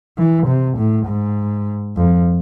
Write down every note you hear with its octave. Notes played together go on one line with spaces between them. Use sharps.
E3
C3
A2
G#2
F2